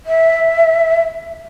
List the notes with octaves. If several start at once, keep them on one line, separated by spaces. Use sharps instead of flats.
E5